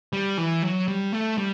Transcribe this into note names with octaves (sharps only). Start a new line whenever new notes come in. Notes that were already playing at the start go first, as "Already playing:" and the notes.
G3
E3
F#3
G3
A3
G3